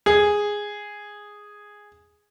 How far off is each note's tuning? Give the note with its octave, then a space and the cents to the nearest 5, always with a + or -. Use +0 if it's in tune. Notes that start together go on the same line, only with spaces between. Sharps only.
G#4 -5